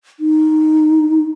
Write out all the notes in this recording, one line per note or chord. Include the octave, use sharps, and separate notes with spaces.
D#4